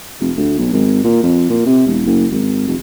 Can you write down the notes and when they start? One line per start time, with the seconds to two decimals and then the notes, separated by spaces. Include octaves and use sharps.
0.20 F1
0.37 D2
0.59 B1
0.73 G#1
1.04 A#2
1.23 F2
1.50 A#2
1.66 C3
1.87 E1
2.06 F#1
2.32 G#1
2.67 F1